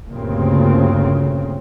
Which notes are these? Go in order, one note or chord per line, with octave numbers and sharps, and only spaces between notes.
D2 G2 A#2 C#3 C4